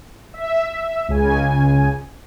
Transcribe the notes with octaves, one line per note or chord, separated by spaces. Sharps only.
E5
C#2 C#3 G#5